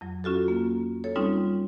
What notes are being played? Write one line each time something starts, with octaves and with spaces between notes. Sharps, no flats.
F2 F#3
C#4 F4 F#4 A4
A#3
A4 C#5
G3 C4 C#4 D#4 F4